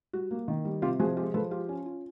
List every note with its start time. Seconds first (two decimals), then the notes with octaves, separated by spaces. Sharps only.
0.13 G3 F#4
0.31 A#3
0.48 D#3
0.65 G3
0.82 C3 F4 G4
0.99 F3 F#4 G#4
1.17 G#3 F4 G4
1.34 F3 A4 B4
1.51 F4 G4
1.69 C#4
1.86 F4